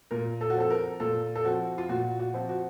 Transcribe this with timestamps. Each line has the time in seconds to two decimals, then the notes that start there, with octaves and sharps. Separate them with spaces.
0.11 A#2 A#4
0.41 A4
0.50 F#4
0.55 F3 C4 A4
0.70 A#4
1.00 A#2 A4
1.35 A4
1.45 F3 C4 F#4
1.78 F4
1.89 A#2 F#4
2.19 F#4
2.34 F3 C4
2.49 F#4